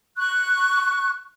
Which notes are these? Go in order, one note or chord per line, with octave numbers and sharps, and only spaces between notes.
C#6 F#6